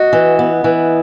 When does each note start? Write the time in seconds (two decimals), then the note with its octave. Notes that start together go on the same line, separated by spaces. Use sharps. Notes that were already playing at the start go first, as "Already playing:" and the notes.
Already playing: F#4 D#5
0.13 E3
0.39 B3
0.64 E3